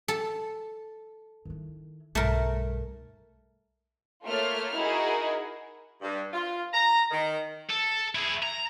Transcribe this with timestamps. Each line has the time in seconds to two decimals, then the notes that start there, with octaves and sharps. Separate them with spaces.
0.08 A4
1.45 D#3 E4
2.15 B1 G2 A3 A#4
4.26 A3 A#3 F4 C#5 E5 F6
4.75 D#4 E4 F#4 G#4 A#4
6.01 G2
6.33 F4
6.72 A#5
7.11 D#3
7.70 A4
8.15 E4 G#4
8.43 A#5